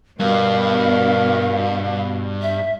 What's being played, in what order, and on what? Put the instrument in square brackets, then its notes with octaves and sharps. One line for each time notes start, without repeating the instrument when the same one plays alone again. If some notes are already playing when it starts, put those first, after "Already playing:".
[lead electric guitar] G2 [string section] B2 [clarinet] A#4 [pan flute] F5
[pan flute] E5